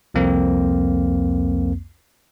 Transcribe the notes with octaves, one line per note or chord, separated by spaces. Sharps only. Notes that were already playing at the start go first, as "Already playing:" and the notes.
C2 F2 A#3 C4